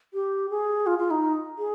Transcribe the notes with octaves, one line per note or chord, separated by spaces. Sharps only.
G4
G#4
F4
F4
D#4
G#4